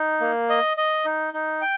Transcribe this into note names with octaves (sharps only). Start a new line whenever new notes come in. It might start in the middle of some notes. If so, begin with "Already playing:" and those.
Already playing: D#4
A#3
D#5
D#5
D#4
D#4
G5